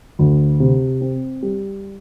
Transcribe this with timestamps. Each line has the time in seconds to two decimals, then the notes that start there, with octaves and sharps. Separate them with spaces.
0.19 D2
0.60 C3
1.01 C4
1.42 G3